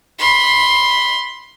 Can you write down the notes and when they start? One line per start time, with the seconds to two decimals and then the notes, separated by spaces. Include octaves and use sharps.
0.19 B5 C6